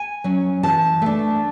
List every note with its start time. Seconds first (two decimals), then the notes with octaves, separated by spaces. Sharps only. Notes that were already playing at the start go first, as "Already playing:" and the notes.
Already playing: G#5
0.24 F#3 C#4
0.63 E3 A5
1.02 A3 D4